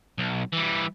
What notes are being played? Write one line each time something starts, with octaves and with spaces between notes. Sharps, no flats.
B1
E3 G3